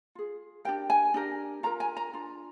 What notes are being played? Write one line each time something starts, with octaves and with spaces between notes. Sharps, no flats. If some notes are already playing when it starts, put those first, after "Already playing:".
F4 G#4
D4 G4 A#4 G5
G#5
D4 G4 A#4
F4 A#4 A#5
G#5
A#5
D4 F4